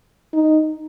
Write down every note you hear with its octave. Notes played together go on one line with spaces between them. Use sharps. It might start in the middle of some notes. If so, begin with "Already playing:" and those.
D#4